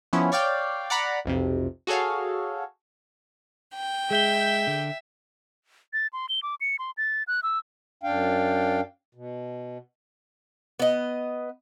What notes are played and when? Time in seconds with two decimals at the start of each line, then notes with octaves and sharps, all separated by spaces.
0.13 F3 B3 C#4 E4
0.32 C#5 D5 F5 G5
0.90 D5 F#5 A#5 B5
1.25 B1 F2 C3
1.87 F#4 G#4 A4 C#5 F5
3.75 G5
4.11 G#3 G#4 E5 G6 G7
4.67 D3
5.93 A6
6.13 C6
6.29 G7
6.43 D6
6.61 C#7
6.79 C6
6.97 A6
7.28 F#6
7.43 E6
8.03 F#2 D4 F5 G5
9.15 B2
10.80 B3 D#5